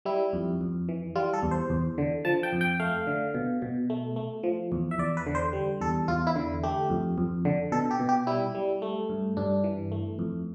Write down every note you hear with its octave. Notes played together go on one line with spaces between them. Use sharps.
G3 E4
F2
F2
E3
G3 F4
A4
E2
C5
E2
D3
F3 A5
G5
F2
G5
A3 F5
D3
B2
B2
A3
A3
F3
E2
E5
E2 D5
B4
D3
C5
G3
E2 A4
E2 F4
E4
D3
A3 G4
F2
F2
D3
B2 A4
G4
B2
G4
G3 E4
G3
A3
G2
G2 D4
E3
A3
F2